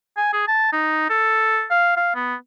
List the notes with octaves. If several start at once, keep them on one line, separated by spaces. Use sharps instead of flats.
G#5
G#4
A5
D#4
A4
F5
F5
B3